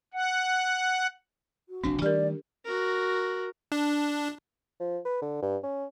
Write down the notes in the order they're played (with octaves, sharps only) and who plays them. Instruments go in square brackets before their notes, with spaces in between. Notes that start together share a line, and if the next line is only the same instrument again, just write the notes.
[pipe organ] F#5
[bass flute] F#4
[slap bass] F1 A#1 C4 [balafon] D4
[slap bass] D#3 G3 A3 [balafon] G4 A#4 [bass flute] D5
[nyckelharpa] F#4 A#4
[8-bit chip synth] D4
[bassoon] F3
B4
D3
G2
C#4